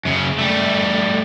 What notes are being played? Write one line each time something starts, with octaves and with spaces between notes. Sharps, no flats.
F#2 C#3
G3 A3